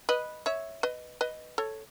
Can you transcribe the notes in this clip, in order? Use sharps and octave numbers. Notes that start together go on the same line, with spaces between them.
B4 D#5
C#5 E5
B4 D#5
B4 D#5
A4 C#5